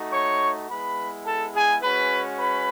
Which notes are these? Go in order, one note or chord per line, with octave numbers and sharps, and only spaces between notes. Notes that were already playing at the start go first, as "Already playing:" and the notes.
Already playing: A3 D#4 F#4
C#5 C#6
G#3 B3 E4 B4 B5
A4 A5
G#4 G#5
G#3 C#4 F#4 B4 B5
B4 B5